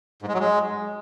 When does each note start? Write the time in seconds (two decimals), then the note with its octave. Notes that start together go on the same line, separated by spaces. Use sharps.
0.22 G#2
0.28 G#3
0.34 F#3
0.40 G#3